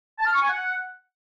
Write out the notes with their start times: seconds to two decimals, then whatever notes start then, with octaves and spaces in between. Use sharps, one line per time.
0.19 A5
0.27 F6
0.34 C#6
0.42 G#5
0.50 F#5